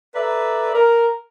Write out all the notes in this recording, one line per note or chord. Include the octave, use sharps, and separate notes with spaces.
A4 B4 D5 E5 A#5
A#4